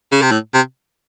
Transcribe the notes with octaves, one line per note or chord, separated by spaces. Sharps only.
C#3
C3
A2
C3